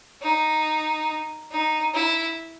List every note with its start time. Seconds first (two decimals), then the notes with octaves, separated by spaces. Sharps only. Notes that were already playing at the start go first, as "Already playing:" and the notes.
0.22 D#4
1.51 D#4
1.94 E4